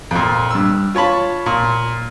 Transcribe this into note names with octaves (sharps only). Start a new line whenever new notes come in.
F2 A#2
G2 E6
F4 C#5 A5 B5
A#2